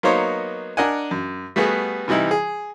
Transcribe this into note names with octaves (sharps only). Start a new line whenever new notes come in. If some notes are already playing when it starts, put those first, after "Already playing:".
F#3 A#3 B3 D#4 C5 C#5
D4 A#4 D#5 F#5 G#5
F#2
G3 A3 B3 F#4 G#4
C3 E3 G3 D#4 E4
G#4